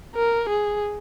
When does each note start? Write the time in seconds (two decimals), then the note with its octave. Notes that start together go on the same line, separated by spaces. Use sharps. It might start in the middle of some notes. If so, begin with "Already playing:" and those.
0.15 A#4
0.49 G#4